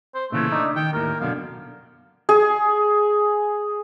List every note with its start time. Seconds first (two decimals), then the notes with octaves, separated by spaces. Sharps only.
0.15 C5
0.32 A#2 C#3 E3 A3
0.52 D4 D#4
0.76 D#3 G5
0.93 D#2 A2 A#4
1.20 F#2 B2 D3 F5
2.29 G#4